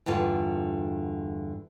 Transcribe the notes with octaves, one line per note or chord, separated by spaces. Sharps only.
E2 G2 D3 F4 C#5